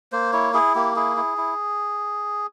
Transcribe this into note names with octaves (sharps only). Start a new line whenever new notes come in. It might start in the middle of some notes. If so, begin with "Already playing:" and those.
A#3 C5
E4 C#5
E4 G#4
A#3 G4
E4 G#4
E4
E4